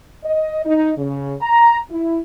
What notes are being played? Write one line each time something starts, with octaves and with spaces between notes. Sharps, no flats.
D#5
D#4
C#3
A#5
E4